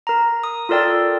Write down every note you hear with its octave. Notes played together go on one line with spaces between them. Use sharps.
A#4 A#5
D#6
F4 A4 A#4 D5 G5 E6